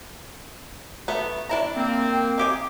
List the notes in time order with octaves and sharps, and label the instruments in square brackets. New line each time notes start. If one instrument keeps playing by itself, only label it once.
[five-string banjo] A3 B3
D4 E4 A#5
[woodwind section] A#3 C4
[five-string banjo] D#4 G4 G#5